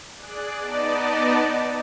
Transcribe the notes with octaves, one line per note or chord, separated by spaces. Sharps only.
G#4 D5 F#6
B3 D#4 D5 D#5 A5